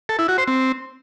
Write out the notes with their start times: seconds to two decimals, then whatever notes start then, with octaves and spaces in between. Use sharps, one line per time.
0.09 A4
0.19 E4
0.28 F#4
0.38 C5
0.48 C4